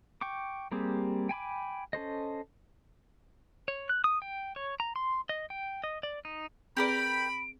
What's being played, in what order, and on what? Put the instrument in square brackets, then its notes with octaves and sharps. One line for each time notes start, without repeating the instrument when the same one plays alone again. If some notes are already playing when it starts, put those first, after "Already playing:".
[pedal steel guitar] G5 C#6 D6
G3 A#3 C4 G4 G#4
G5 G#5 B5 D6
C#4 A4 C5 D#5
C#5
F#6
D#6
G5
C#5
A#5
C6
D#5
G5
D#5
D5
D#4
[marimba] C4 G#4 B4 [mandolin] G4 A#4 D5 [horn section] B5 [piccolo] D7